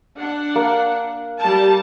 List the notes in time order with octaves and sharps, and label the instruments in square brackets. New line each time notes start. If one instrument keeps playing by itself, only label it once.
[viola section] D4 F#5
[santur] A#3
[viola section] G3 A5